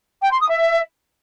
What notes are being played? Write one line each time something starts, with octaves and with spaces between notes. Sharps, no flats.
G5
C6
D#6
E5